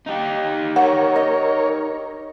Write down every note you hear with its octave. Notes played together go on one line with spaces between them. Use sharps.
D#4 G4
A#4 C#5 F#5
D#5